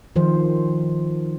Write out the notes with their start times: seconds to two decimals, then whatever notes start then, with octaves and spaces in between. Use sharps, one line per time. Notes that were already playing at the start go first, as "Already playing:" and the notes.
0.16 D#3 F3 C5